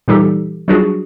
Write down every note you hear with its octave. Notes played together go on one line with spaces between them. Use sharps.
A#2 E3 G3 D#4 G4 A4
F#3 G3 D4 F4 F#4 G#4